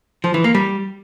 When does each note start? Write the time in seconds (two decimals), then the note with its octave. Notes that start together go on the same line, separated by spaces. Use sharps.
0.24 F3
0.34 E3
0.44 A#3
0.55 G3